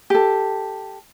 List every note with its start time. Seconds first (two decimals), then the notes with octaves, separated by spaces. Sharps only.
0.10 G4 A4